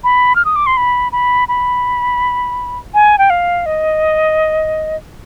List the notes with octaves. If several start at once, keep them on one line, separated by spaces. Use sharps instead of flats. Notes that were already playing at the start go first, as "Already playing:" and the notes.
B5
F6
D#6
D6
C6
B5
B5
B5
G#5
G5
F5
D#5